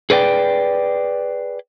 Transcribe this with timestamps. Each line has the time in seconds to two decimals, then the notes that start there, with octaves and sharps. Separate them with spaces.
0.10 G#4 B4 D5 G5